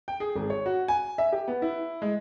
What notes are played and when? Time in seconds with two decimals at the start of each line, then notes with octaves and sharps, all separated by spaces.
0.08 G5
0.20 G#4
0.36 G#1
0.50 C#5
0.66 F#4
0.88 G#5
1.18 E5
1.32 G4
1.48 B3
1.62 E4
2.02 G#3